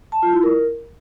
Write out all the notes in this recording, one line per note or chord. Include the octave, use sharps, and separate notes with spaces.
A5
F4
E4
A#4